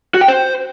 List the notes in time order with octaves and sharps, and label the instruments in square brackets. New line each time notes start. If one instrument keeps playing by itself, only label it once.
[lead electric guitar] F#4
G5
C5